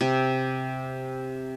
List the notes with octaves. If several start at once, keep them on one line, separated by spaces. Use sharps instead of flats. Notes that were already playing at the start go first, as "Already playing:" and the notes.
C3